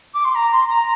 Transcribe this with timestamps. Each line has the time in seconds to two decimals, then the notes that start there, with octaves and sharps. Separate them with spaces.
0.14 D6
0.24 C6
0.35 A#5
0.52 C6
0.69 A#5